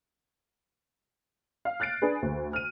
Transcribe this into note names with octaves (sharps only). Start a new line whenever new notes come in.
F5
F6 F#6 A6 C7 D7
D4 G#4 B4
D2
F6 D#7